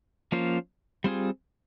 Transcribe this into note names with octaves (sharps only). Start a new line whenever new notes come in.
F3 A#3 C#4 F4 C5
G3 C4 F4 G#4